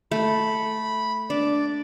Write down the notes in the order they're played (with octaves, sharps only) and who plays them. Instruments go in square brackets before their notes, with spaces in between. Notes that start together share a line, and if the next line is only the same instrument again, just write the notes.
[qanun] A3 [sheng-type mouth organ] B5
[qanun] D4 [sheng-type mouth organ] D5